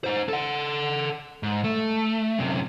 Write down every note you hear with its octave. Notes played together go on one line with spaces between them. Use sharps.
D#4 C5
A4 F#5
G#2
A3
F#2 C3